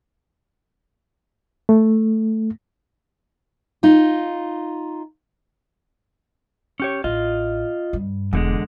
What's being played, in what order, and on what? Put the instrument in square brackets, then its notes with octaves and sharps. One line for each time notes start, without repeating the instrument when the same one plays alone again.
[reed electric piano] A3
[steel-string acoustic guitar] D#4 F4
[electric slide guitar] C#4 G4 C#5
[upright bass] A1 [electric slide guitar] F4 D#5
[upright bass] G2
[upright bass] E1 [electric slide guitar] E2 D3 G#3